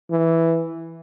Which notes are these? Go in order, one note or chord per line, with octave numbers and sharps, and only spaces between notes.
E3